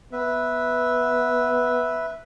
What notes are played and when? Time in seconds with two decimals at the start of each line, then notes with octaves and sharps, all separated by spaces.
0.12 B3 B4 E5